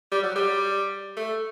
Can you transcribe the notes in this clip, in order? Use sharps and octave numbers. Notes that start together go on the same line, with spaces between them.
G3
F#3
G3
A3